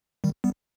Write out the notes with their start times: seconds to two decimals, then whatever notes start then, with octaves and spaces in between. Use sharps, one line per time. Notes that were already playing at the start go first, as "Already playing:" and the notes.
0.24 D#3 G3
0.44 G3 B3